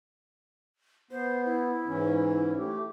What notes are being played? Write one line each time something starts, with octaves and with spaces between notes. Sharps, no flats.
B3 C5
E4
G#2 E3 C#4
A3 G4